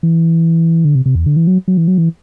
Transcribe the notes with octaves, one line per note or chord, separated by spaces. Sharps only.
E3
D3
C3
C3
E2
D3
E3
F#3
F#3
E3
F#3
E3